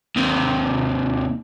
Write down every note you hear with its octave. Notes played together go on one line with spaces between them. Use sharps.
D#2 C3